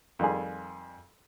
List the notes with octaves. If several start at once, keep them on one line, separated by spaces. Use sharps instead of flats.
F2 D#3 G3 G#4